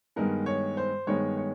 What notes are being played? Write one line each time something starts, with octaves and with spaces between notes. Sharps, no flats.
G2 D#3 G#3 B3 A#4
C#5
C5
G2 D#3 G#3 B3 C#5
C#5